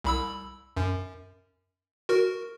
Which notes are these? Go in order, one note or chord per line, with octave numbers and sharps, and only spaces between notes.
C2 B5 E6
F#2
F#4 A#4